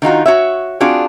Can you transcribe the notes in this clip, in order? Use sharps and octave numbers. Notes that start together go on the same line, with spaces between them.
D#3 D#4 F4 F#4
F#4 C#5 E5
C4 D4 F4 F#4 G#4